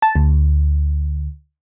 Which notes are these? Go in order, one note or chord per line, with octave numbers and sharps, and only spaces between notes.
A5
D2